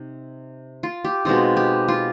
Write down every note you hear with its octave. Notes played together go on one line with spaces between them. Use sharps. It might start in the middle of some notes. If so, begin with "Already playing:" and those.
Already playing: C3 D#4
F4
G4
B2 G#3 C4 D#4 F4
G4
F4